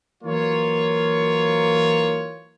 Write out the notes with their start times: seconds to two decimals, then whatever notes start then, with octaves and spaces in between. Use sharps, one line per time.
0.23 E3 F#3 A#3 F4 C#5